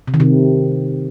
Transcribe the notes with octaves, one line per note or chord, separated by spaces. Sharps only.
C3
D#3
C3